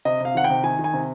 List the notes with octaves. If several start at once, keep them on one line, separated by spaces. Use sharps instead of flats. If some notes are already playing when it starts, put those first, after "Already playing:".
C3 D#5
C3 F5
D#3 F#5
G5
C3
D#3 G#5
D#3
G#5
C3